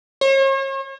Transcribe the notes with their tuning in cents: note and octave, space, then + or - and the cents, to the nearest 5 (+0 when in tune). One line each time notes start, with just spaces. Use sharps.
C#5 -40